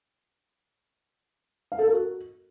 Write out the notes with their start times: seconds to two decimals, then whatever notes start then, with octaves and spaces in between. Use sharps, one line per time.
1.72 F5
1.79 A4
1.85 A#4
1.92 F#4